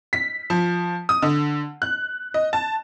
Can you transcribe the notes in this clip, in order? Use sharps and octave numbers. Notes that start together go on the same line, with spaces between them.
B6
F3
D#6
D3
F#6
D#5
A5